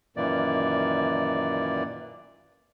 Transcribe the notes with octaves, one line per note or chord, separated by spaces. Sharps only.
F#2 A#2 D#3 E3 A#3 D5